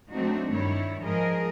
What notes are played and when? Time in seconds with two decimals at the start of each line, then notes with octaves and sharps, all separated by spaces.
0.12 F#3 A3 C4 D4 D#4 F#4
0.52 G2 D#3 G3 E4 C#5
1.03 G#2 F3 G#4 A#4 D#5